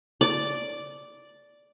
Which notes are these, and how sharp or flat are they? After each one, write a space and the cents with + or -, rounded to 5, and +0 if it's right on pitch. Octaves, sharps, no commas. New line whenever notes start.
D5 -5